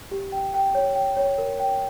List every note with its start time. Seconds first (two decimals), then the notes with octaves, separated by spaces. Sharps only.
0.11 G4
0.32 G5
0.54 G5
0.75 C#5
0.96 G5
1.17 C#5
1.38 A#4
1.59 G5